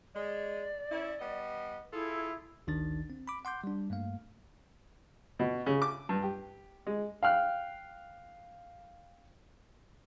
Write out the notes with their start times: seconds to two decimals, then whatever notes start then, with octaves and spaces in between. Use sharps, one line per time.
0.15 G#3 D5
0.92 C#4 E4
1.20 G3 B3 D#5
1.93 E4 F4 G#4 A4
2.67 G#1 D2 D#3 D4 D5 A6
3.10 C4
3.28 B5 D6
3.45 F#5 C6 D6 G6
3.64 G3 D4
3.90 G2 A3 A#3 F5
5.39 B2
5.66 C#3
5.82 D6
6.09 G2
6.23 G4
6.87 G#3
7.23 F5 G5 F6 F#6